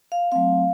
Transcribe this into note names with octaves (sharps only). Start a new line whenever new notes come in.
F5
F#3 A3 C4 F5